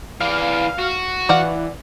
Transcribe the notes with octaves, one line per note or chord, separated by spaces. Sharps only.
E3 D5 F5
F#4
E3 D5 F5 F#5